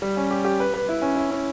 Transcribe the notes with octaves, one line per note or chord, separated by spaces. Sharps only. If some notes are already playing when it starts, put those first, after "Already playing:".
G3
C#4
G4
G4
B4
B4
E4
C#4
E4
C#4